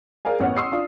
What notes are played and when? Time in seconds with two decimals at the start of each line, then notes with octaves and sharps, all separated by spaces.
0.25 G#4 A#4 D5 F5 G#5
0.40 A1 B3 C#5 F#5 F6
0.57 C6 C#6 D#6 E6 C7
0.72 D4 F4